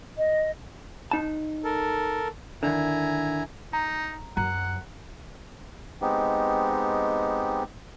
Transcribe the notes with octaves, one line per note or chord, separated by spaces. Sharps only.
D#5
D#4 A5
A4 A#4
D3 D#3 E4 G#5 A#5
D#4 A#5
F#2 F#5 A#5
G#3 B3 C4 D#4 G4